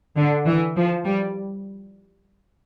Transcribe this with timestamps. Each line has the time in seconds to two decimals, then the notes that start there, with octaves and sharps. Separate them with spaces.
0.17 D3
0.46 E3
0.76 F3
1.05 G3